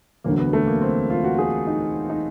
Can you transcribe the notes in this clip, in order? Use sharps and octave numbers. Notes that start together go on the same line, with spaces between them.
E1 D2 D3 F#3 A#3
B3
A3
A#3
C4
F4
F#4
G#4
D#4
D#4